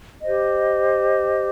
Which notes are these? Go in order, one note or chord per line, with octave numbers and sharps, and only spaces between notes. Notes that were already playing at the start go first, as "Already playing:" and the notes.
G4 C5 D#5